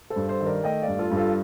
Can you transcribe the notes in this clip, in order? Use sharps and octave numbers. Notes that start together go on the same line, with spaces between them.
A4 C5
G2
A4 C5
D#3
A#4 D5
A3 D#5 G5
D5 F5
G2
F4 A4
G2
F4 A4